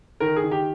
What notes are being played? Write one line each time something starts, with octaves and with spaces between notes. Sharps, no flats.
D#3 A#4
G#4
D#3
G4